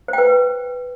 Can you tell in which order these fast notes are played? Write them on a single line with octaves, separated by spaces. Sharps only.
C5 G5 B4